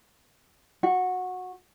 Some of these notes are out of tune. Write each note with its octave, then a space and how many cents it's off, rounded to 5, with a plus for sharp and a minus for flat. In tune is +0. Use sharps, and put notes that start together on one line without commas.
F#4 -15